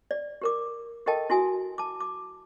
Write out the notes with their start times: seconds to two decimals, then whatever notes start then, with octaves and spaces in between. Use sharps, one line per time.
0.11 D5
0.42 G4 A#4 D6
1.06 G4 A4 A#4 D#5 G5 A5
1.30 E4 F#4 G#5 D#6
1.78 A5 D6
2.00 D6